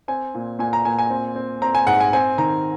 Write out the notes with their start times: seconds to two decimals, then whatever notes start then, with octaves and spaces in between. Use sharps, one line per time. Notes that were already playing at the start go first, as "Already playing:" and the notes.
0.08 C4 G#5
0.35 A#2
0.59 A#2 G#5
0.73 A#5
0.85 A#2 G#5
0.99 G#5
1.10 C4
1.36 C4
1.62 C4 A#5
1.75 G#5
1.87 G#2 F#5
2.00 G#5
2.13 C4 G#5
2.38 D#3 A#5